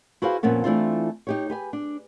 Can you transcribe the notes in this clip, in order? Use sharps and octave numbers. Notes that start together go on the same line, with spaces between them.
E4 F#4 G#4 B4 C5 F5
F2 A#2 A#3 B3 C#4
E3 A3 C4 D4 E4 F4
D#4 G4 C#5
G4 B4 G#5
D4